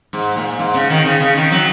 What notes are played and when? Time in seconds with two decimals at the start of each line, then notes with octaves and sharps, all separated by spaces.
0.13 G#2
0.36 A#2
0.59 G#2
0.74 C#3
0.90 D#3
1.05 C#3
1.20 C#3
1.36 D#3
1.51 F#3